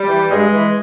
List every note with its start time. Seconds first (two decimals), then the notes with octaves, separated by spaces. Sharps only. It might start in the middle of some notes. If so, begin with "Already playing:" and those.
Already playing: G3
0.08 E3
0.31 G2 G#3
0.53 E3